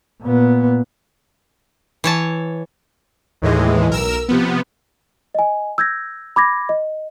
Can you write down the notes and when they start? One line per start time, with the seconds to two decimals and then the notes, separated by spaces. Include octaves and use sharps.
0.22 A#2 B3
2.04 E3 C#5 A5
3.42 D#2 A2 E3 G#3
3.89 B1 A#4 E6
4.29 C3 F3 B3
5.35 D#5 G#5
5.78 E6 G6 G#6 A#6
6.36 B5 D6 G#6 A#6
6.69 D#5